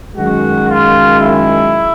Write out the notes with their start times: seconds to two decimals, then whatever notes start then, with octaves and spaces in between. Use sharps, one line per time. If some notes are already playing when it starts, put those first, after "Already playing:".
0.15 F#2 D#3 G#3 F#4
0.68 F4
1.19 E4